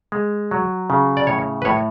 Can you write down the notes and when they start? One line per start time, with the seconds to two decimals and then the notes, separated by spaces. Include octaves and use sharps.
0.12 G#3
0.51 F#3
0.90 C#3
1.17 D5
1.27 A2 C#5
1.62 B4
1.65 A2 C#5